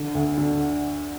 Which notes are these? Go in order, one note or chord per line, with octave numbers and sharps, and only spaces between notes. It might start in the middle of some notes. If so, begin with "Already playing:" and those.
Already playing: D3
D2
D3